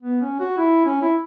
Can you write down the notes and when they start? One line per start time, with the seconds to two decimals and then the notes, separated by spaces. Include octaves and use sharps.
0.02 B3
0.21 C#4
0.40 F#4
0.58 E4
0.86 C#4
1.02 E4